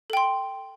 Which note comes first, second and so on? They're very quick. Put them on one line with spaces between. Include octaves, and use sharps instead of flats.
A4 G5 C6